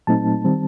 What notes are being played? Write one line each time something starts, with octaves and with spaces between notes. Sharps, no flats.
A#2 F#3 A3 C4 D#4 A5
D#3 G3 C4